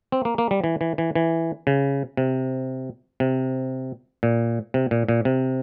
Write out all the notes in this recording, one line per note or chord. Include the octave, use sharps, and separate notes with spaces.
C4
A#3
A#3
G3
E3
E3
E3
E3
C#3
C3
C3
A#2
C3
A#2
A#2
C3